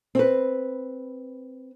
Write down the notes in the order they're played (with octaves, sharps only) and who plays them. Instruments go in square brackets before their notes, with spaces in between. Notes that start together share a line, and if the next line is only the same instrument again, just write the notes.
[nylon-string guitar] C4 B4